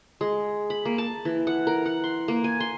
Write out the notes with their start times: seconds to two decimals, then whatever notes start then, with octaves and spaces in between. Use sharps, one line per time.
0.21 G#3
0.70 B5
0.85 A#3
0.98 A5
1.25 E3
1.47 F#5
1.67 A#4
1.86 F#5
2.04 C6
2.28 A#3
2.44 G#5
2.60 C6